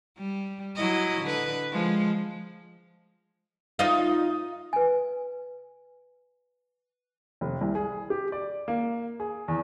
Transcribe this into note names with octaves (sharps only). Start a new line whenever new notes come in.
G3
F#3 E4 D#5
D3 B4
F3 G#3
D#4 F4 D#5
B4 G#5
F1
C2
G#4
G4
D5
A#3
G#4
E2